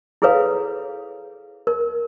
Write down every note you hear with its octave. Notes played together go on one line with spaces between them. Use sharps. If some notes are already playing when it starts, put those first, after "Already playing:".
E4 G#4 A4 B4 C#5 F5
A#4